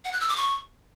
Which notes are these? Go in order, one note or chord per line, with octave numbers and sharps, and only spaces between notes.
F#5
F#6
E6
D6
C#6